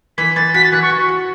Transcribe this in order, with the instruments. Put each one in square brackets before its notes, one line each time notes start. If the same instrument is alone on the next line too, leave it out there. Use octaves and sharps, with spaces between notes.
[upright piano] E3 [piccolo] B6
[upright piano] E3 [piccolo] A6
[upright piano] F#4 [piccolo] B6
[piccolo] A6
[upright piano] E3 [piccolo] F#6
[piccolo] C#6
[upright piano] F#4
F#4